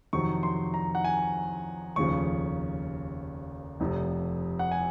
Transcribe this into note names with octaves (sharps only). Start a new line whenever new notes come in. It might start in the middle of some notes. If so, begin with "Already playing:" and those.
F2 C3 D#3 F#3 C#6
C6
A#5
F#5
G#5
F1 D#2 C#3 F3 C#6
F1 F2 C3
F#5
G#5